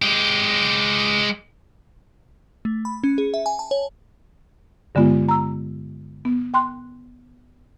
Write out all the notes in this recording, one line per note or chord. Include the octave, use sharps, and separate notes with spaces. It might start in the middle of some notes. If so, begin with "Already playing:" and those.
G#3 G4
A3
B5
C#4
G#4
E5
G#5
A5
C#5
G2 D3 G#3 B3 F4
A#5 E6
B3
G5 C6 F#6